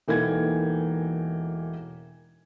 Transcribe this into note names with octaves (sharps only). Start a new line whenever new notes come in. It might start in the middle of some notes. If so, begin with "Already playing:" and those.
E1 E3 A#3 D#4 A4 G#6